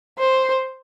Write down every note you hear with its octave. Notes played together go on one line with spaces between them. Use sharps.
C5